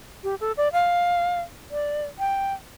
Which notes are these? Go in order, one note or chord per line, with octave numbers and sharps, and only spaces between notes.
G4
A4
D5
F5
D5
G5